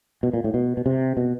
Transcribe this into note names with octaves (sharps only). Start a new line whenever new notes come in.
B2
A#2
A2
B2
B2
C3
B2